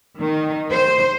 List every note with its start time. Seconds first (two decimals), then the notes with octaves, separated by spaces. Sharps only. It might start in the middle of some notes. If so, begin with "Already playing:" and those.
0.18 D#3
0.70 C5